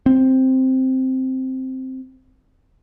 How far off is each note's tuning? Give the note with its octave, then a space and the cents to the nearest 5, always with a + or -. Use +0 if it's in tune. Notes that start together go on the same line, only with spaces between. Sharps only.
C4 +0